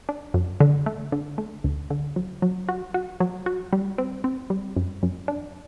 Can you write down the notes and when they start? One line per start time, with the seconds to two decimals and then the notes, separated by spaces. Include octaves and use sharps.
0.09 D4
0.34 F#2
0.60 D3
0.86 A3
1.12 D3
1.38 A3
1.64 D2
1.90 D3
2.16 F#3
2.42 F#3
2.69 F#4
2.94 F#4
3.20 F#3
3.46 F#4
3.73 G3
3.98 C4
4.24 C4
4.50 G3
4.76 F#2
5.03 F#2
5.28 D4